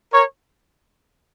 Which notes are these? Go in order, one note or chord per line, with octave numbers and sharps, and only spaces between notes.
A#4 C#5